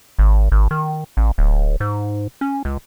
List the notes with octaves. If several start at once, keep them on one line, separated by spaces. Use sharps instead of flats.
G#1
G#1
D#3
A1
D1
G#2
C#4
C#2